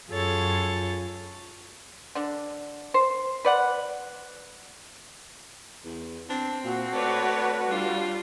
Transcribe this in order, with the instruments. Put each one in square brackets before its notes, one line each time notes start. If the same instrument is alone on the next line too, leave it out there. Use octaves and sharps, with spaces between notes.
[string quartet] F#2 F4 G#4 A4 C#5 A6
[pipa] D3 D4
C5
B4 D5 F#5
[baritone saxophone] E2
[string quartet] C4 [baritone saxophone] D4
[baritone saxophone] A#2 [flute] F#4
[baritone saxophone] A3 [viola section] B4 C#5 D5
[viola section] G3 [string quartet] D4 F4